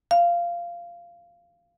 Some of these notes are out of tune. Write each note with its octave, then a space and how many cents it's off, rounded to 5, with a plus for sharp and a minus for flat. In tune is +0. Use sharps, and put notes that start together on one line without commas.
F5 -15